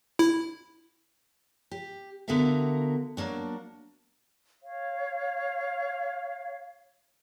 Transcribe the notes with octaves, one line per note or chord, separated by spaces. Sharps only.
E4
G4
D3 B3 F#4 A#4 E5 F5
F#3 A#3 D4 F#4
C#5 F5